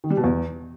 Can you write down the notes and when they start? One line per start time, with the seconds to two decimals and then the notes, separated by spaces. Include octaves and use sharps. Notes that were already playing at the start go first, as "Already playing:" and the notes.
0.04 D#3
0.10 G3
0.17 B2
0.24 E2